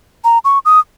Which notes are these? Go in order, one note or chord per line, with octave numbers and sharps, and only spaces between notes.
A#5
C#6
D#6